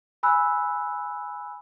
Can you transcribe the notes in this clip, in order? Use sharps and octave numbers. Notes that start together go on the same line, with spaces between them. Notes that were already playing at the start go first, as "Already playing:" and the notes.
G#5 B5 E6 F#6